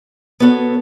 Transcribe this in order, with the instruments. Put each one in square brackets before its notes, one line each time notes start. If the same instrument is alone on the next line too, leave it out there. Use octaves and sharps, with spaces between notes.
[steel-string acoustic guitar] B3 F#4 A4 C#5